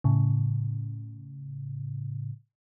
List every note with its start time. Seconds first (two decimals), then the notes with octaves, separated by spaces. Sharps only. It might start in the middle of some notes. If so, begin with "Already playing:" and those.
0.04 A2 C#3